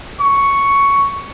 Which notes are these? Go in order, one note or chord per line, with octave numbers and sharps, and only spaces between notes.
C#6